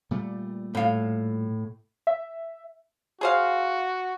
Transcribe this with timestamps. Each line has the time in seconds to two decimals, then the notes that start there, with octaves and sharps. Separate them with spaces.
0.11 A#2 G3 A3
0.75 A2 F5
2.07 E5
3.21 F#4 G#4 C5 F5